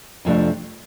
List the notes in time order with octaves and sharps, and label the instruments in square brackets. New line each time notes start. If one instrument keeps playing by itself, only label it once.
[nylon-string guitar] F2 C3 F3 A3 D4